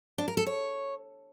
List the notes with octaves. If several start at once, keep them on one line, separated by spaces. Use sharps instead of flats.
D4
A#4
A4
C#5